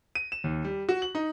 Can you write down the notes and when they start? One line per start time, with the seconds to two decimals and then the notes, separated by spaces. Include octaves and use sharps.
0.15 D#7
0.32 E7
0.44 D#2
0.65 G3
0.89 F#4
1.02 F#7
1.15 D#4